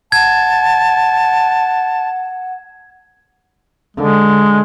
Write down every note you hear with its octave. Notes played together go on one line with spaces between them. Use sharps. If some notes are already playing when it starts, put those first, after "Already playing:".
F#5 A5 G#6
D3 G#3